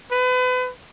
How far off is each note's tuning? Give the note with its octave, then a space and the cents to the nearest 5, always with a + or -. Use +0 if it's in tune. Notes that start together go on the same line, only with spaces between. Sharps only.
B4 +35